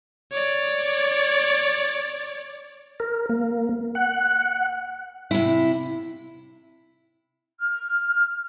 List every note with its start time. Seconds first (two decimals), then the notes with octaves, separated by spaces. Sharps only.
0.32 C#5 D5
3.00 A#4
3.30 A#3
3.95 F#5
5.31 C3 E4
7.60 F6